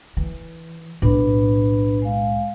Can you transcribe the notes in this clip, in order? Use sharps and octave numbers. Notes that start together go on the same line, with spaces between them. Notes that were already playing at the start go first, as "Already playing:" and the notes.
E3
B1 A2 D4 B4 B5
G#3 F5